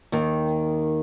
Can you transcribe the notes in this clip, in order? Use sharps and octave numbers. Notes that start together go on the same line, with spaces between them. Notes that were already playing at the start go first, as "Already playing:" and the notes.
D#2 D#3